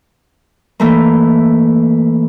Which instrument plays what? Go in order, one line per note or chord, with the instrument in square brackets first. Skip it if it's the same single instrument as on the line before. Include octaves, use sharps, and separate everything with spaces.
[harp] E3 A3 A#3